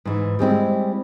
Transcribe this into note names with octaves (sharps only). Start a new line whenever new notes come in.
G#2 E3
G3 G#3 C4 E4